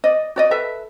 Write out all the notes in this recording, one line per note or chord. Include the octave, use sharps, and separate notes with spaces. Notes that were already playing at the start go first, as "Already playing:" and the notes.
D5 D#5
F#4 D5 D#5
A4 B4 E5